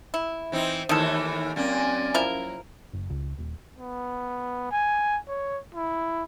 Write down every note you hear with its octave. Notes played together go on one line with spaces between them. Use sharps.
E4
E3 C4 D#4
D#2 D#3 E3 A3 E4 A4
F#2 A#3 C4 D5 G#5
F3 E4 A#4
F#1
C#2
D#1
B3
G#5
C#5
E4